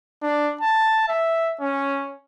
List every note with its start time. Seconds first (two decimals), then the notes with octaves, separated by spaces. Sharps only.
0.22 D4
0.62 A5
1.08 E5
1.61 C#4